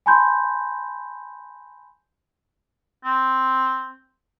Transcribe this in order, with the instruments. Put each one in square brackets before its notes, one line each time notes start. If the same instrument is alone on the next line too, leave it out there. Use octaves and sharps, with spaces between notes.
[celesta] G#5 A5 B5 C6 G6
[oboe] C4